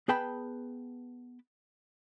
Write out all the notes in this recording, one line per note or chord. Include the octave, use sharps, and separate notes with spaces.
B3 G#4 B4 G5 A5 B5